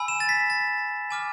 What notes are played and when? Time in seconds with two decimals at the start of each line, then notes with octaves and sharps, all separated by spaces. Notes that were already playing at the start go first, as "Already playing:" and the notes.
Already playing: G#5 B5 E6
0.08 E7
0.20 A6
0.29 B6
0.50 A6
1.10 G#5 D6 F6